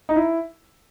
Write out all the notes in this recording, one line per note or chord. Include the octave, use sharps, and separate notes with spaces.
D#4
E4